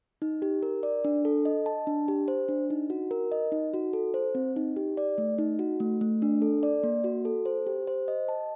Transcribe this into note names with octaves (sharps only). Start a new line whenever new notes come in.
D#4
G4
A#4
D5
D4
A4
D#5
A5
D4
G4
C5
D4
D#4
F#4
A#4
D#5
D#4
F#4
A4
C5
C4
D#4
G4
D5
A3
D#4
F#4
A3
A3
D4
A4
D5
A#3
F#4
A4
C5
G4
C5
D#5
A5